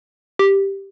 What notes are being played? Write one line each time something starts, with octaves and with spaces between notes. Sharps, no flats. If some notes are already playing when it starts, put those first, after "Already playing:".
G4